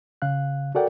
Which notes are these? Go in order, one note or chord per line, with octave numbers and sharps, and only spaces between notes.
C#3 F5 F#6
F#4 A4 A#4 D5 F#5 G5